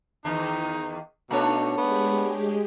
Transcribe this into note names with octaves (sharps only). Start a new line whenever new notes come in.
E2 D#3 D#4
B2 A3 D4 D#4 C#5
G#3 B3 G4 G#4